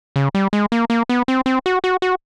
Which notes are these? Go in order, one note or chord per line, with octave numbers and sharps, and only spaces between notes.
C#3
G3
G#3
A#3
A#3
B3
C4
C4
F#4
F#4
F#4